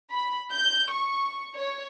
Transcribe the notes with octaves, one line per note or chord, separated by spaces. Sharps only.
B5
G6
C#6
C#5